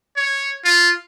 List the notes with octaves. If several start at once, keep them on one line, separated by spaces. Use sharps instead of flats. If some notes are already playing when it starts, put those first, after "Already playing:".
C#5
F4